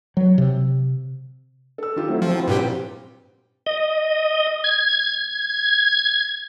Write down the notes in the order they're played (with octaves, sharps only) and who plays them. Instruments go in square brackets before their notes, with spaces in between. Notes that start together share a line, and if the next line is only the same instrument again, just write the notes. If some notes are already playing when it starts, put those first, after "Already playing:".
[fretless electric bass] F#3
C3
[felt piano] A4 E6
D#3 F4 G4
[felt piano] F#3 [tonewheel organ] A3 C4 E4
[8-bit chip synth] F3 [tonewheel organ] C4
[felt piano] F#3 E4
[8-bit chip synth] G2 A#2 G4 [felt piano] B4
[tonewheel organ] D#5
G#6